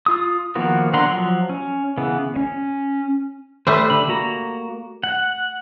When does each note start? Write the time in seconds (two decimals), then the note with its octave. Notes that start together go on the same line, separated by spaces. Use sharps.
0.06 F4 D#6
0.55 D#3 F3 A#3 B3 F#4
0.93 D3 F#5 A#5 C6
1.05 F3 F#3
1.50 C#4
1.98 C#3 E3 B3
2.36 C#4
3.67 G3 A3 B4 C5
3.90 D3 B5
4.08 A#3 F#4 A#5
5.03 F#5